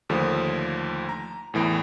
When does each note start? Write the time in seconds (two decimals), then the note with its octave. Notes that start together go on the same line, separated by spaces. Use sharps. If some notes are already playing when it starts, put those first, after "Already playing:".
0.09 D#2 D3 F3 A3 D#6
1.09 A#5
1.54 E2 A2 E3 D7